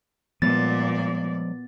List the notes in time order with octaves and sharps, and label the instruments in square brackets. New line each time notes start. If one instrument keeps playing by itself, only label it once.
[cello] A#2 D5 [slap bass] F3 G3 G#3 [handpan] B3 [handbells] A6